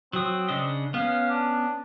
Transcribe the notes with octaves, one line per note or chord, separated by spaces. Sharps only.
F#3 C4 D#6
C#3 D4 D#5
B3 C#4 F5
D4